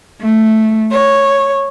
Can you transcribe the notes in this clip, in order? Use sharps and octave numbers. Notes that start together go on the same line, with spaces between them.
A3
C#5